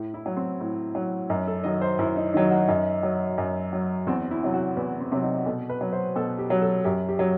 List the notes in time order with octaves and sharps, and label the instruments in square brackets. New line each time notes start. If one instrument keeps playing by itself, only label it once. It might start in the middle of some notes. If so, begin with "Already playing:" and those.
Already playing: [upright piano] A2
E4
F#3
C4
A2
F#3
F#2 D#4
A4
D#3 F#3 D#5
C5
F#2 E4
D#4
D#3 F#3 D#4
F#4
F#2 D#4
F#3
F#2
F#3
E2 C4
E4
C3 F#3
F#4
E2 B4
C4
C3 F#3 C4
D#4
B2 A4
B4
F#3
C5
B2 A4
G4
F#3
A4
F#2 G4
G4
F#3